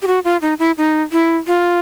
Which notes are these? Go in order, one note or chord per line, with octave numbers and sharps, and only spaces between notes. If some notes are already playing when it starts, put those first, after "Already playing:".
G4
F#4
F4
D#4
E4
D#4
E4
F4